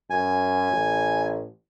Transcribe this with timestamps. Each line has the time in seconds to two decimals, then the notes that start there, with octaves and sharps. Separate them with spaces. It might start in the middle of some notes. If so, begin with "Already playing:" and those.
0.10 F#2 G#5
0.72 A1